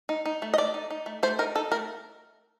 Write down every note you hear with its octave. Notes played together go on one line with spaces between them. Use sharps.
D#4
D#4
A3
D#5
A3 D5
D#4
D#4
A3
A3 C5
D#4 A#4
D#4 A4
A3 A#4